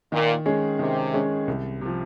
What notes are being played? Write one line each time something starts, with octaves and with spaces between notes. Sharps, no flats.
A#2 D#3
G#3 C#4 G#4
C3 D#3
G#3 C#4 G#4
C2
C3 F3